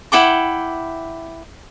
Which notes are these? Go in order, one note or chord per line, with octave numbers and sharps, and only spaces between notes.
E4 F#5 G5 D6